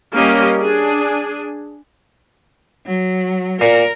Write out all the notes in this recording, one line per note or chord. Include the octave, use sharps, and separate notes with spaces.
G3 A#3 C#4 G4 A#4 D#5
D4 G#4
F#3
A#2 A#4